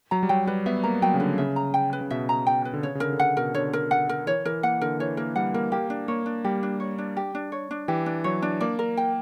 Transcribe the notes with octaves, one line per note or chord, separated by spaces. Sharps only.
F#3 A#5
G3
F#3 G5
G3 B4
B3 E5
A#3 A#5
F#3 G5
C#3
D3 B4
C#3 E5
A#5
G5
B4
C#3
B2 E5
A#5
G5
B4
D3
C#3 C#5
C#3
D3 A#4
D3
C#3 F#5
B2 A#4
D3 C#5
A#4
F#5
A#4
E3 C#5
E3 A#4
A#3 F#5
D3 A#4
E3 C#5
A#3 A#4
G3 F#5
A#3 A#4
A#3 G4
D4
A#3 C#5
D4
G3 G4
D4
C#5
D4
G4
D4
C#5
D4
E3 G4
D4
F#3 C#5
D4
A#3 D5
A#4
G5